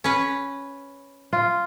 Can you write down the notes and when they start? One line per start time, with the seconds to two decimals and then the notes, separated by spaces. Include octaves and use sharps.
0.04 C#4 B4
1.33 F4